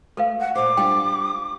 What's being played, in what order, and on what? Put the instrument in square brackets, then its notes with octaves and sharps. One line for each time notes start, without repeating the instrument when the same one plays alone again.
[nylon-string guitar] A3 [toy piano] A4 B4 F5
[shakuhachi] F#5
[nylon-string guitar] A#2 C5 [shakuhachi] D6
[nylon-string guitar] G3 D4 F4 [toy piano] G5